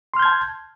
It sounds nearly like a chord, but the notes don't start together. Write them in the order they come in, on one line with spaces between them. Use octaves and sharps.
C6 F6 G6 G#6 A5